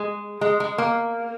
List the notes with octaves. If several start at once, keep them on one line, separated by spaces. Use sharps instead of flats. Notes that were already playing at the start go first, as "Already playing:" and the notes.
Already playing: G#3
G#3
G#3
A#3